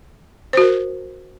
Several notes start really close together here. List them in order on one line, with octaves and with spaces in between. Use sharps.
C5 F#4 A#4